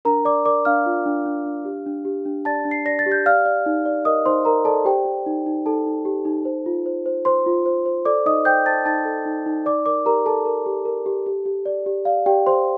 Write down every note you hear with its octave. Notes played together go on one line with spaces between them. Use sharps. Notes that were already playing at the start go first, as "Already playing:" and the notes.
D4 A#4 A#5
D5 D6
A#4 D5 D6
D4 F5 F6
F4
D4
D4
D4
G4
D4
G4
D4
D5 A5 A6
D4
C7
D5 A#6
A6
G4
G6
D5 F5 F6
D5
D#4
D5
A#4 D#5 D#6
D#4 C5 C6
A#4 A#5
A4 D5 A5
G4 C5 G5
G4
D#4
D#4
D#4 A4 A5
D#4
G4
D#4
C5
F4
C5
C5
C5 C6
F4
C5
C5
A4 D5 D6
D#4 D#5 D#6
C5 G5 G6
C5 A5 A6
D#4 A5 A6
A4
D#4
D#4
D5 D6
A#4 D5 D6
G4 A#4 A#5
A4 A#4 A5
A#4
G4
A#4
G4
G4
G4
D5
G4
D5 F5
G4 D5 G5
G4 C5 C6